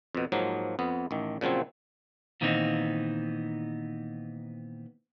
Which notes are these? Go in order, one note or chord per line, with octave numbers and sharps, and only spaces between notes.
F2 B2
G#2 F3 F#3 A#3
F2 B3
A1 D#3
A#2 C#3 F3 F#3 C4
A#2 D#3 E3 B3 C4 D#4